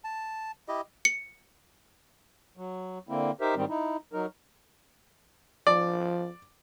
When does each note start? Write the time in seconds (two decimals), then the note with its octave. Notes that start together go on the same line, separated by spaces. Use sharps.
0.04 A5
0.68 E4 G4 D#5
1.05 C#7
2.57 F#3
3.09 D3 A#3 C4 E4
3.41 D#4 G4 A#4 C5 E5
3.55 G#2 D#3 G3 C4
3.69 D#4 E4
4.13 F#3 D#4 A#4
5.67 F3 D5